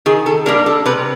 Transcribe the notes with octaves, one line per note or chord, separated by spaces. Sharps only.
D#3 G#4
A4
G3 A#3 D4 A#4
A4
C3 B4